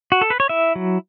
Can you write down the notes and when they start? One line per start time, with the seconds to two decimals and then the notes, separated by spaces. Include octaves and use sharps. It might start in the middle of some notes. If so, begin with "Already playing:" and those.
0.12 F#4
0.21 A4
0.30 B4
0.40 C#5
0.49 E4 E5
0.76 F#3